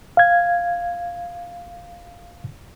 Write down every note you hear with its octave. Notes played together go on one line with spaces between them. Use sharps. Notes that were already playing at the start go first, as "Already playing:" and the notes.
F5 G#6